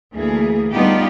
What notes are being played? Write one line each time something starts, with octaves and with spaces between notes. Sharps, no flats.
D2 E3 A#3 G#4
G3 B3 D4 D#4 F4 G4